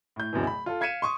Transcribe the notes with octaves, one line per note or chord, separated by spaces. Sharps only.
A2 G6
D1 F#2 B2 E3
B5
F4 A4
F5 G#6 B6 C#7 D#7 E7
C6 C#6 D#6